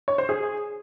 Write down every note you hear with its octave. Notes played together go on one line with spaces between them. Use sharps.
C#5
C5
G#4